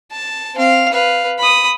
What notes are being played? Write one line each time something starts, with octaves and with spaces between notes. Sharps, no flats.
A5
C4 F5
B4 F5
B5 D#6